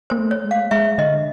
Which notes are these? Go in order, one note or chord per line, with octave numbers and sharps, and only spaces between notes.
A#3 C5
A3
C#5
G#3
F5
G#3 E5
D3 D#5